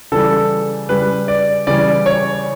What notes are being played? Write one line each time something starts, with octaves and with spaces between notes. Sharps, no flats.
C#3 E3 G3 A4
C#3 G3 B4
D5
C#3 E3 G3 D5
C#5